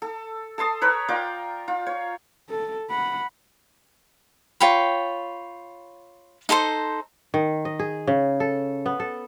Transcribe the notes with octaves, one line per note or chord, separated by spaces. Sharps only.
A4
A4 A5 C6 D#6
A#4 B4 C#5
F4 A#4 D5 G5
F4
C#5
A4
F#5 B5
F4 C#5 G5 B5
D#4 A4 C5 C6
D#3
D#5
G#4
C#3
A4
B3
A4